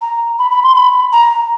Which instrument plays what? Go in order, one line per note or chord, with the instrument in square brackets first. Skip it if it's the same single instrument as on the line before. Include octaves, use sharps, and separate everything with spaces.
[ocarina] A#5
B5
B5
C6
B5
A#5